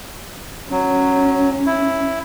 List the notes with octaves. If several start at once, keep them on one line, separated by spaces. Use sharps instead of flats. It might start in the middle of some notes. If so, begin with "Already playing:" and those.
F#3 C#4
E4